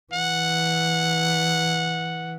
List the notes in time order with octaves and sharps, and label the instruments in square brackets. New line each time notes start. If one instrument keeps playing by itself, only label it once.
[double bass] E3 [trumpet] F#5